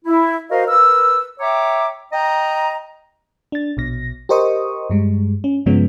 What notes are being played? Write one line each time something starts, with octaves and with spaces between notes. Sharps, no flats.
E4
F#4 A#4 C5 D#5 F5
A#4 B4 E6
C#5 E5 G5 A#5 D6
D#5 G5 A#5
D4 A6
A#1 B2 A#6
G4 A#4 C5 D#5 C#6 D#6
G2 G3 G#3
C#4
G2 C#3 F3 G#3 B3 C#4